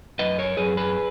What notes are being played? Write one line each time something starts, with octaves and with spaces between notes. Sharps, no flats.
F#2 B4 D#5
A#4 C#5
F#2 G#4 B4
G#4 B4